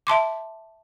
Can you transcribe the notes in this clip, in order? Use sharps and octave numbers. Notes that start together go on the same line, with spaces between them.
E5 A5 C6 D6